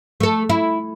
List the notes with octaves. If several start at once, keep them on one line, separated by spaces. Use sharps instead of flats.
A3 A4
E4